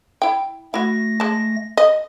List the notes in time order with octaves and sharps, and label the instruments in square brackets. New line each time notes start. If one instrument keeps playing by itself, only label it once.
[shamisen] E4 G5
[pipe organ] A3 A#6 [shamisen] E4 F#4
[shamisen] G#3 A5
D#5